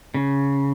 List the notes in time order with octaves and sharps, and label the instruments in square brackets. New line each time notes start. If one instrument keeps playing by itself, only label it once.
[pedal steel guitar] C#3